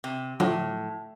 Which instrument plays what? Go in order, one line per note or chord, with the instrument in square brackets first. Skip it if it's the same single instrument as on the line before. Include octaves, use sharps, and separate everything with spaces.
[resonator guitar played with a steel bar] C3
[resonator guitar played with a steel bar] A2 [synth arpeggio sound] D3 F3 F#3